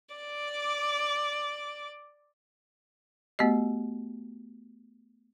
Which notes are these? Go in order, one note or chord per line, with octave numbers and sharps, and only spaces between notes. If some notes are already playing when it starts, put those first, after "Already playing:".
D5 D6
A3 B3 F#4 G4 D#5